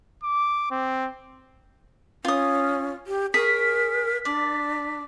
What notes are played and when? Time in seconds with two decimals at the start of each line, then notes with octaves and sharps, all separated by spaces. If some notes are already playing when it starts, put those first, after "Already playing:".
0.23 D6
0.71 C4
2.25 C#4 F4 D#6
3.07 G4
3.34 G#4 A#4 C#5 B6
4.25 D4 D5